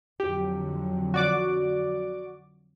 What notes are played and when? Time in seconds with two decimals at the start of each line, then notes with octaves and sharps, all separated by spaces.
0.20 F2 D3 F#3 G4
1.14 F#4 D5 D6